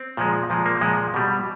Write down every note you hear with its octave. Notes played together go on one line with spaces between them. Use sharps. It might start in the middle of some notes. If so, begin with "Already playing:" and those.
Already playing: C4
A#2 F3 G#3
A#2 F3 G#3
A#3
A#2 F3 G#3
B2 G3